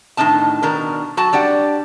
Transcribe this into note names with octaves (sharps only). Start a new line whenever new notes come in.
A2 D#3 D4 D#4 A5
B2 D#3 D4 A#4
F#3 F#4 A5
G3 D4 D5 F#5